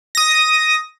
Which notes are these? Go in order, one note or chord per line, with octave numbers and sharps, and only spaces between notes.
D#6 A#6